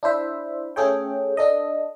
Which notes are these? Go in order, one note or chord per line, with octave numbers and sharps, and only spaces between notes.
D4 E4 C5 E5
A3 C#4 G#4 A4 C#5 G5
D4 A4 D#5